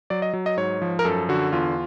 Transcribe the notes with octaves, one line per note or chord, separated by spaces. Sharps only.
F#3 D5
D#5
F#3
D#5
G#2 C#5
F3
A#4
F#2 A4
D3 F#4
E2 F4